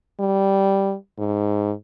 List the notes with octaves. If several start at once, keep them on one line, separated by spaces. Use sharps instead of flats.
G3
G#2